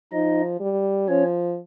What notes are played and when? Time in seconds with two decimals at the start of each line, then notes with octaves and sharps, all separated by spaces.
0.13 F3 D#4 D#5
0.60 G3
1.09 F3 C#4 C#5